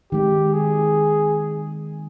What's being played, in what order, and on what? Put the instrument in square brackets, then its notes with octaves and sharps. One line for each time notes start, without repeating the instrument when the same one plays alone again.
[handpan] D#3 G#3 C4 [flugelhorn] G4
[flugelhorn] G#4